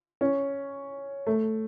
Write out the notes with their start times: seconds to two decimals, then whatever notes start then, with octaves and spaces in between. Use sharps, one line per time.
0.21 C#4
1.27 A3